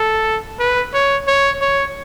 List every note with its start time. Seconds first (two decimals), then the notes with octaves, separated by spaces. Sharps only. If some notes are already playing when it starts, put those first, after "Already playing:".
Already playing: A4
0.59 B4
0.94 C#5
1.27 C#5
1.61 C#5